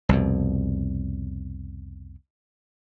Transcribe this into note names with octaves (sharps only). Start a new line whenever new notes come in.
C2 F2 B2